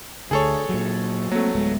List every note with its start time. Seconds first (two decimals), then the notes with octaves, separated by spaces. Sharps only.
0.31 D2 D3 G#4 A4 C#5
0.69 A#2 F#3
1.31 F#3 A3 A#3 C4
1.55 D1 G#3 B3